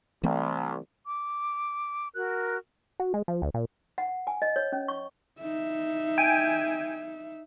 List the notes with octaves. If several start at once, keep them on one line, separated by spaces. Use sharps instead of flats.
C2 E3 A3 C4
D6
F#4 A#4 F#6
F#4
G#3
F3
D2
A#2
F#5
G#5
D#5
C#5
C#4
C#6
D#4 E5
G5 G#5